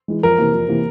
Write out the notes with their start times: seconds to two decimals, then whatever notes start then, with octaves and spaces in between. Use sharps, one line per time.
0.08 E3 G#3
0.23 F2 A#4
0.38 C3 E3 A#3
0.54 F2
0.68 C3 E3 A#3